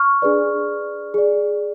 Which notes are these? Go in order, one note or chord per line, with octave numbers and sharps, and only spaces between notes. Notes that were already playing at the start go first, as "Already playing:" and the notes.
Already playing: C#6 F6
D4 G#4 B4 D5
G#4 D5